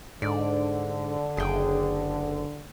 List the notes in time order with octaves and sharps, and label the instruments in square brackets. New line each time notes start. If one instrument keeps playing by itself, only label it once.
[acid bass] G#2 [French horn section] D3 [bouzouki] D5
[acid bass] F#1 [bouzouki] G#4 G5